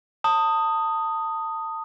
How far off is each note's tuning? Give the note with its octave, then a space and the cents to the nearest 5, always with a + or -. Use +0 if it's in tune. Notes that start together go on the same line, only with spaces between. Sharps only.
A5 +30 D#6 +0